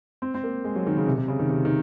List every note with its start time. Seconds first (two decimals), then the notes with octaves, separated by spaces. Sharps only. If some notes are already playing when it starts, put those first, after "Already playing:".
0.22 C4
0.34 C4
0.44 A#3
0.64 G#3
0.76 F#3
0.87 D#3
0.97 C#3
1.07 C3
1.18 C3
1.28 C#3
1.39 D#3
1.49 C3
1.65 D#3